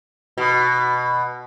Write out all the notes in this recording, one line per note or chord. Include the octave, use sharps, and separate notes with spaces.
B2